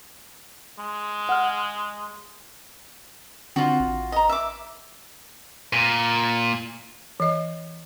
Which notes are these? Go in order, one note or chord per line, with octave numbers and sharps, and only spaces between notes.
G#3
F#5 F6
D3 C4 D4 F4 F#4
A1
D#5 A#5
E5 D6
A#2
E3 D#5